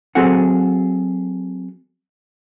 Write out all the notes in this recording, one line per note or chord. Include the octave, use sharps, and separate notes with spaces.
F#3 C4 F#4 G#4 A4 F#5